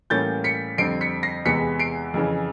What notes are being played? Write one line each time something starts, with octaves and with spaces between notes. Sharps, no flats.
A2 E3 G3 A#3 C#4 G6 A6
B6 C#7
F2 D3 G3 C4 C7 D7
B6 C#7
A#6 C7
E2 C3 E3 G#3 B3 B6 C#7
C7 D7
F2 C#3 E3